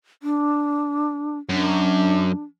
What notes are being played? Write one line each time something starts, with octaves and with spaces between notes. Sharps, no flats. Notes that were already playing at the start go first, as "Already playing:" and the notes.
D4
F#2 D4